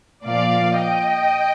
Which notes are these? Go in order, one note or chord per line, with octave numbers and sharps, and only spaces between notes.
A#2 F3 D5 F5
D#5 G5